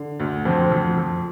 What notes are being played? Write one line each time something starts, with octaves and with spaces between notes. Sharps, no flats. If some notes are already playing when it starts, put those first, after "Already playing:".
Already playing: D3
D2
F2 C4
F2
F2